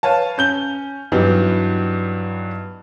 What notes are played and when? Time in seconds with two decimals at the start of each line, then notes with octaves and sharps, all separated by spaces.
0.03 B4 C#5 F5 A5
0.38 C#4 G6 G7
1.12 G2 E3 F#3 B3 D#4 G4